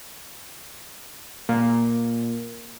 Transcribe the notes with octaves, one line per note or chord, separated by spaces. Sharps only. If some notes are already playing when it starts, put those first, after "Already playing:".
A#2